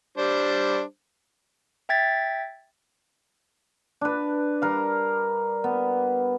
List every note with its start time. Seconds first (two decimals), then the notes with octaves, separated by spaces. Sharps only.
0.18 G3 D4 C5
1.89 E5 G5 G#6 A6 B6
4.01 D4 B4
4.62 G3 A#4 F5
5.64 B3